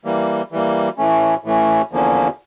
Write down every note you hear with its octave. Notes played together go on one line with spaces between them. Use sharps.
E3 G3 A#3
E3 G3 A#3
A2 E3 A3 C#4
A2 E3 A3 C#4
E2 D3 F3 A#3 C#4